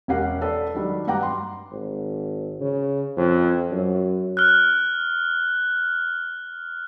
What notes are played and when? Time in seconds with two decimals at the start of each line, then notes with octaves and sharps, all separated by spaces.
0.08 E1 C#4 G4 A#4 F#5 C7
0.42 A4 B4 D5
0.74 D#3 F#3 G3 D4
1.07 G2 F#5 G5 A#5 D6
1.23 C6
1.71 G#1
2.60 C#3
3.17 F2
3.72 F#2
4.37 F6 F#6